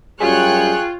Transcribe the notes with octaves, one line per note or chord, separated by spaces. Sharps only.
F#2 G3 F4 G#4 C#5 G5 F#6